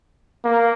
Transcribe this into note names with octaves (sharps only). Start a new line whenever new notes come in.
A#3